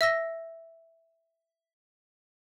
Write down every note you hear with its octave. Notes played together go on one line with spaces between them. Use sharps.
E5 E6 A#6